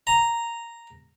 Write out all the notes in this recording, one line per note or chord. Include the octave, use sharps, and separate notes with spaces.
A#5